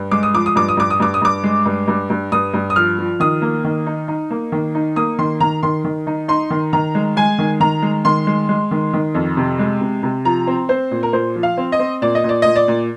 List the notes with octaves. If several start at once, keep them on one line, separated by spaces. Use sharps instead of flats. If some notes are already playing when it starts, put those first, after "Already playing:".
Already playing: G2
G#3 D6
D#6
F3 D6
D#6
G2 D6
D#6
G2 D6
D#6
G2 D6
D#6
G2 D6
G#3
G2
G2
G2
G2 D#6
G2
D#6
F3 F6
F3
D#3 D#6
A#3
D#3
D#4
D#4
A#3
D#3
D#4
A#3 D#6
D#3 C6
D#3 A#5
D#3 C6
D#3
D#4
D#4 C6
D#3
D#3 A#5
G#3
G#3 G#5
D#3
D#3 A#5
G#3
D#3 C6
G#3
G#3
D#3
D#3
F2
C3
G#3
C3
C3
F3 A#5
C4
C4 C5
A#2
A#4
A#2 C5
F3
F5
C4
D#5
C4
A#2 D5
D#5
A#2
D5
A#2 D#5
D5
A#2